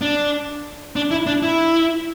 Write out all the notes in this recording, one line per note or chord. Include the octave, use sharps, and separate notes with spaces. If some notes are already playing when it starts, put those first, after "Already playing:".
D4
D4
E4
D4
E4